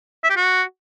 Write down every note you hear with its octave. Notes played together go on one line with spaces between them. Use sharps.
E5
G4
F#4